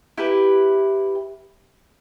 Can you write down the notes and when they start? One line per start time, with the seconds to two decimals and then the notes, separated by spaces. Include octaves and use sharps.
0.18 E4 G4 B4